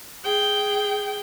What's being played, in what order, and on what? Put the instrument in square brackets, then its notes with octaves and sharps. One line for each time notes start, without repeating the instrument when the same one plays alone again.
[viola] G#4 G5